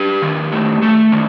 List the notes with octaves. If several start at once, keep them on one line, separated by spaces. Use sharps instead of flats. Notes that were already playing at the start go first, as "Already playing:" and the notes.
Already playing: G4 B4
D#3
A3
A3
D#3